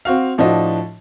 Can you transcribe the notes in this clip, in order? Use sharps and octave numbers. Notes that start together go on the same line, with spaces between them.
C4 F#4 F5
A2 F3 D4 F#4 D#5